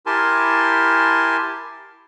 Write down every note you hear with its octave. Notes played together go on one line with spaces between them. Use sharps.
E4 G4 A#4 G#5 A5 C6